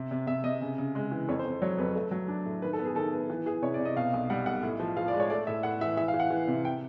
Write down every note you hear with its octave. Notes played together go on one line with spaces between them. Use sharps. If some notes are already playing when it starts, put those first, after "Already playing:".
Already playing: C3
C3
C3 E5
C3 D#5
C#3
C#3
G#3
E3
F2 C#5
C5
F2
F#3 C#5
F2 B4
A3
F#3
D4
A2
D#3 B4
A4
B3
G#4
D#3 A4
B3
E3
E3 G#4
C3 C#5
D5
C3
D#5
B2 F5
B1
G3 F#5
B1 F#5
A2
F3
F3 F5
D5
G#3
C#5
A3 D5
A2 E5
A2 F#5
E3 E5
E3 E5
F5
E3
F#5
E3
C3
G5